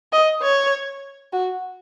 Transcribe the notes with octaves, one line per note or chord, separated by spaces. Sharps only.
D#5
C#5
F#4